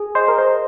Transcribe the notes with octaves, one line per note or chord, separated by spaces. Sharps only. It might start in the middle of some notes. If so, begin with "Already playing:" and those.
Already playing: G#4 G#5
C5 D#5
A#4
C5